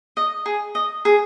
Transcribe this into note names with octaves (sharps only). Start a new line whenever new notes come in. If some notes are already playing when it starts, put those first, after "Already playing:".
D#5
G#4
D#5
G#4